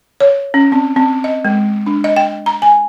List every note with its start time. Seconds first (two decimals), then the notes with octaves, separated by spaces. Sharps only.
0.20 C#5
0.54 C#4
0.72 C4
0.96 C4
1.24 D#5
1.45 G#3
1.86 D4
2.04 D#5
2.16 G5
2.46 A#5
2.62 G#5